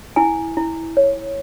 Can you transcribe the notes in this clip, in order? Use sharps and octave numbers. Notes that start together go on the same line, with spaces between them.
E4 G#5
E4
C#5